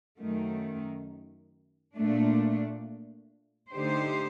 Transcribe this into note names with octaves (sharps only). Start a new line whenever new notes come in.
F#2 D#3 A3
A#2 A3 D4
D3 A3 D#4 G4 C5